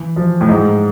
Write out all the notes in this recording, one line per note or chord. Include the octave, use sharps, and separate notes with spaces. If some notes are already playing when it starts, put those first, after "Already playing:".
Already playing: E3
F3
A2
G#2